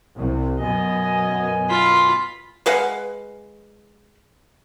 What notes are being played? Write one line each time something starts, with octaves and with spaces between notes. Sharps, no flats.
C2 C3
F#2 B2 B3 D#5 G#5
F4 B5 C6
G#3 B4 F5 F#5